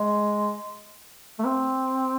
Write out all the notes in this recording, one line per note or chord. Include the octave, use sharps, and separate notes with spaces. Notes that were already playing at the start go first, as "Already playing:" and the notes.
Already playing: G#3
A3
C4